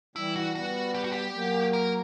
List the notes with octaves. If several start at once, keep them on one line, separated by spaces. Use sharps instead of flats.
E3 G3 E4
F#4
G3 B3 F#4
G4
F#4
G4
F#3 A#3
A#4